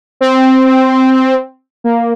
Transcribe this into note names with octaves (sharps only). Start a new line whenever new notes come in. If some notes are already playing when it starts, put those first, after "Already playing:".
C4
A#3